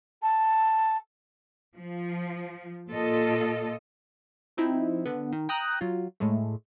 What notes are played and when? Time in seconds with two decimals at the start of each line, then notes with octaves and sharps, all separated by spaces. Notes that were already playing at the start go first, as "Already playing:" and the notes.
0.22 A5
1.77 F3
2.90 A#2 F4 A4 D#5
4.57 F3 C4 D#4 E4
5.05 D3 B3
5.33 D#3
5.49 G5 A#5 D#6 F#6
5.81 F#3 F4
6.20 A2 G#3 A3